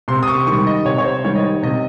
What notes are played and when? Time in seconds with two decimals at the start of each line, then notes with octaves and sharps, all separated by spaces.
0.08 C3 C6
0.23 D#6
0.27 C#6
0.47 D#3 G3 C#6
0.67 D#5
0.85 C3 C#5
0.98 C#5
1.04 C5
1.24 D#3 G3 C#5
1.36 D#5
1.43 C#5
1.63 C3 D#5